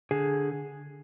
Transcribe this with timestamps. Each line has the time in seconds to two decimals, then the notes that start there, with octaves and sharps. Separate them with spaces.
0.11 D3 G#4